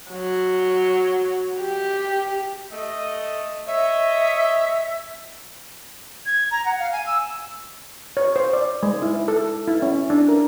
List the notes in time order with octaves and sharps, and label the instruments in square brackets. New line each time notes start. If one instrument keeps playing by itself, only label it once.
[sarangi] F#3
G4
[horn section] A3 D#5
[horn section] C#5 D#5 [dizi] E5
[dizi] G#6
A#5
F#5
F5
G#5
E6
[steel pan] C#5
C5
D5
G#3
E4
A4
E4
C#4
D4
A#4